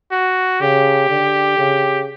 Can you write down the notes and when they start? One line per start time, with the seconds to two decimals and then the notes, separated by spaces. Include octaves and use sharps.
0.12 F#4
0.61 C#3 G4
1.09 D3
1.58 C#3